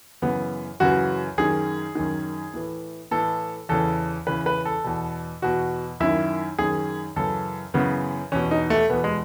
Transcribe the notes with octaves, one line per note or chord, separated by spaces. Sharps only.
F#2 C#3 E3 B3
F#2 C#3 E3 F#4
F#2 D#3 G#4
F#2 D#3
A2 E3
A2 E3 A4
E2 C#3 E3 A4
E2 C#3 E3 B4
B4
A4
E2 B2
E2 B2 F#4
F#2 D#3 E4
F#2 D#3 G#4
F#2 C#3 E3 A4
F#2 C#3 E3 B3
E2 B2 C#4
D#4
A3
E2 B2 B3
G#3